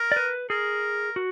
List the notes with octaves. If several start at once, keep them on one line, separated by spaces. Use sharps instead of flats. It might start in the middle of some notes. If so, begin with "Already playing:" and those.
Already playing: A#4
D5
B4
G#4 A#4
F#4